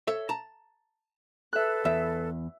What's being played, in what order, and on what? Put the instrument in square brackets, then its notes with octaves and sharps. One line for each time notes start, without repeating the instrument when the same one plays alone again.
[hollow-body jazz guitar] A4 C#5 E5
A5 A#5
[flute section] A4 B4 [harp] E5 F#6
[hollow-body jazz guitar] E2 [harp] E5